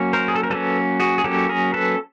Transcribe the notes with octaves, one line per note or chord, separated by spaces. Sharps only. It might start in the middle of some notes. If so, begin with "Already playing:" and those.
Already playing: F#3 A#3 C#4
A#4 C5
G#4
A4
A#4
F#3 A#3 C#4 A4 B4
F#4 G#4
G#4
F#3 A#3 C#4 G4 A4
G#4 A#4
A4 B4